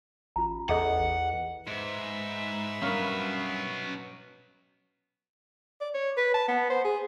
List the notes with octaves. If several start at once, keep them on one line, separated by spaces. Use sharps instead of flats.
A1 F4 A#5
E2 G#4 A4 D#5 F#5
G#2 B4 E5
G2 F#3 B3 C#4 A#4 C#5 F5 B5
D5
C#5
B4
A5
B3
C5
G#4